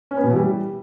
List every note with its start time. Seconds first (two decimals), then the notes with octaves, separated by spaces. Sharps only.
0.11 C#4
0.17 B3
0.24 B2
0.30 E3
0.36 G3